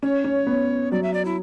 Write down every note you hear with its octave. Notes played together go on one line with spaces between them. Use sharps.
C#4 C#5
C#4
B3
F#3 D5
E5
D5
E4